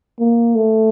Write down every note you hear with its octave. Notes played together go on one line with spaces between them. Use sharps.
A#3
A3